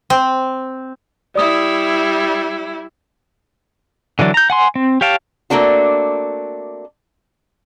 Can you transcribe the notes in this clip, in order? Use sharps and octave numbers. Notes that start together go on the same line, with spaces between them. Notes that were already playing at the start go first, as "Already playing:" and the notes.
C4
G3 E4 D5 D#6
D3 E3 F#3 D4
A#5 G6
F#5 G#5 C6
C4
G4 C#5 F5 G5 A5
A3 A#3 C4 D4 F#4